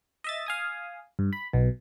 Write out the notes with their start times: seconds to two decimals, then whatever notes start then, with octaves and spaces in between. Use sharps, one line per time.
0.24 D#5 E5 A6
0.46 F5 G#5 D#6
1.19 G2
1.33 B5
1.53 B1 B2